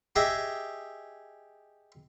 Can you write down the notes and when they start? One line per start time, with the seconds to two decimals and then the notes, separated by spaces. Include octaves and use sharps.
0.16 G4 G#4 D#5 E5 G5 G#5